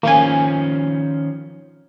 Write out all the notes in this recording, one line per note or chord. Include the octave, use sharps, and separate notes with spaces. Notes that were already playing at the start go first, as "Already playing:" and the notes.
D#3 F3 A#3 C#4 G#5